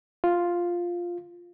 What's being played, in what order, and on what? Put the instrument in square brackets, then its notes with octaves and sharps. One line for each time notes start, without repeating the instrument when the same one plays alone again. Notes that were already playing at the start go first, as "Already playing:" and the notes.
[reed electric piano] F4